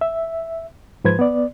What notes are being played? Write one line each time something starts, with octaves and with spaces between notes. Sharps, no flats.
E5
G#2 F3 B4 C5 G#6
B3 D5